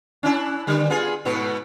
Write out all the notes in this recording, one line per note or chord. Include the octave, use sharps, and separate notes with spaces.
C#4 D4 E4
D3 G3
B3 F4 G#4
G#2 B2 B3